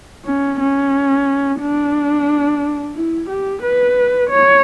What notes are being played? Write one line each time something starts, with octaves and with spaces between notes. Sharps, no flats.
C#4
C#4
D4
E4
G4
B4
C#5